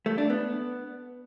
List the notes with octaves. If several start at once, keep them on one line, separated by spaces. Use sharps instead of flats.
A3
D4
B3